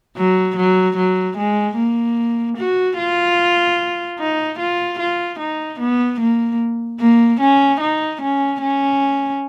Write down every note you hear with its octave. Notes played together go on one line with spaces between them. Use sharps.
F#3
F#3
F#3
G#3
A#3
F#4
F4
D#4
F4
F4
D#4
B3
A#3
A#3
C#4
D#4
C#4
C#4